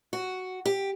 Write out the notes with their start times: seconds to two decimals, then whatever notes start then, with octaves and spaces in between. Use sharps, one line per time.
0.13 F#4
0.66 G4